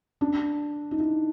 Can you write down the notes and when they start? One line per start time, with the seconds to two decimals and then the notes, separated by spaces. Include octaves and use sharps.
0.21 D4
0.91 D#4
1.00 E4